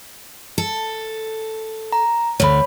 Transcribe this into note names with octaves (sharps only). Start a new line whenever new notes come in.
A4
A#5
D2 D3 C#5 B5